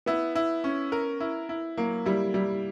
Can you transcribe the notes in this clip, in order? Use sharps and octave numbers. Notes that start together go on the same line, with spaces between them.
B3 E4
E4
C#4
A#4
E4
E4
F#3 A#3
G3 E4
G3 E4